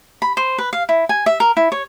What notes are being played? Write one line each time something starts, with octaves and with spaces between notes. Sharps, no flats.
B5
C5
B4
F5
E4
G#5
E5
A#4
E4
C#5